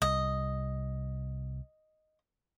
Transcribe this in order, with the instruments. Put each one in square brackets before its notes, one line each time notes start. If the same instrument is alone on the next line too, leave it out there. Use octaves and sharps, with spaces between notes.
[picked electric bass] C2 [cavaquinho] D#5